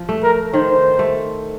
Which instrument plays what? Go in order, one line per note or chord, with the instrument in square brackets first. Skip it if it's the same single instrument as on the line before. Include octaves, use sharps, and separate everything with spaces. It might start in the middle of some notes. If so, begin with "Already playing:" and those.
Already playing: [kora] F3
A3
[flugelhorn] A#4
[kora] D#3 [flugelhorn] C5
[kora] A3